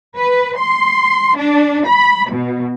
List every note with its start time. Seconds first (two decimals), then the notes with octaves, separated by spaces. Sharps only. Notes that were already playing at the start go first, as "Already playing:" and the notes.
0.18 B4
0.58 C6
1.38 D4
1.88 B5
2.31 B2